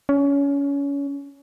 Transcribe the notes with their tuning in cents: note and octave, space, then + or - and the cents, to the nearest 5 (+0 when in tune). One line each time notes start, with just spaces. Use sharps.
C#4 +25